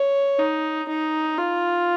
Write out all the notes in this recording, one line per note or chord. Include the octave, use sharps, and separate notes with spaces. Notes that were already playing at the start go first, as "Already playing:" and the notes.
Already playing: C#5
D#4
D#4
F4